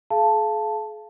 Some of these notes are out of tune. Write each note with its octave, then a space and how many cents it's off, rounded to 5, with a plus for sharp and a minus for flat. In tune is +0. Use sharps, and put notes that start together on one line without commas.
G#4 +40 F5 -20 A5 +0